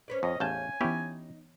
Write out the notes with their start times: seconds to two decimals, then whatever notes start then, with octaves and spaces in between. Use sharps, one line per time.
0.08 C#4 B4 D5
0.23 F2 C#4 D#5
0.40 A1 E2 F5 G#5 A5 G6
0.81 E3 B3 C#4 D#4 E4 G4